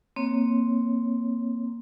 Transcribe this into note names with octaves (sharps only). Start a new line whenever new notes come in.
A#3 C4 C#5